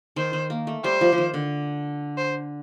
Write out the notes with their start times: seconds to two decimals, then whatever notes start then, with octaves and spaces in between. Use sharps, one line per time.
0.16 D#3 C5
0.33 D#3
0.50 A#3
0.67 A3
0.84 G3 C5
1.01 F3
1.12 F3
1.18 D#3
1.34 D3
2.18 C5